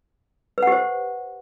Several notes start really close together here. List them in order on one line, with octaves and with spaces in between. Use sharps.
B4 F#5 G4 C5